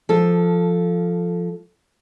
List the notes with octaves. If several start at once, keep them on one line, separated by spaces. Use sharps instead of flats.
F3 A4